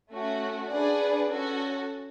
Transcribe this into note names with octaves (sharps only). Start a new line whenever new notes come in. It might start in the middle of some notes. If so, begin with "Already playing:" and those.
A3 C#4 F#4
D4 G#4 B4 D5 F#5
C#4 F#4 A4